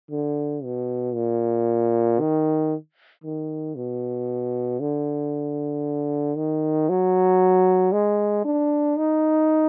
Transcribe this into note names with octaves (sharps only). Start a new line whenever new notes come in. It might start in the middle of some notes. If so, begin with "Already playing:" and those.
D3
B2
A#2
D#3
D#3
B2
D3
D#3
F#3
G#3
D4
D#4